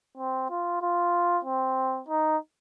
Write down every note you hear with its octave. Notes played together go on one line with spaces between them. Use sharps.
C4
F4
F4
C4
D#4